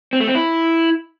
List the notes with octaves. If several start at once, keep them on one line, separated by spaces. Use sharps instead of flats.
C4
A3
C4
E4